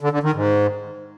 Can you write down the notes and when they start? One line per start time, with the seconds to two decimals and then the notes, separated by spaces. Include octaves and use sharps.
0.01 D3
0.12 D3
0.23 D#3
0.34 G#2